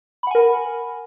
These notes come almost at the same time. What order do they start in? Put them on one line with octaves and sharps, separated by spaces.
B5 F#5 G#5 A#4